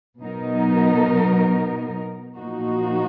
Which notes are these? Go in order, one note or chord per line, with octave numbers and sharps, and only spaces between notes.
B2 F#3 B3 D#4 A#4
A#2 F3 A#3 D#4 F#4